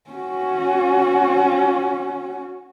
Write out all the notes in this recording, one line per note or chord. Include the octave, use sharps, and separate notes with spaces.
C#4 F#4